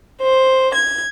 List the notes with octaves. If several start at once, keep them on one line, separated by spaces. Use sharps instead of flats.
C5
G#6